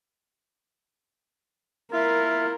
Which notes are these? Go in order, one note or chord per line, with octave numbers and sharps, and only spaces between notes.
A#3 E4 F4 A#4 E5